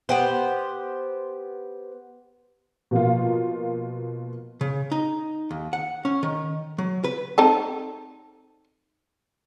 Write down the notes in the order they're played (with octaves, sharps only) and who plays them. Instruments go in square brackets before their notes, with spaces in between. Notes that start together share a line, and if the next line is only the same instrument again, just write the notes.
[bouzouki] B3 G4 C5
[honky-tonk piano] B2 F3 A#3 F4
[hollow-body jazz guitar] C#3
D#4
D#2
F#5
C#4
D#3
F#3
B4
[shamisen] C4 D#4 A4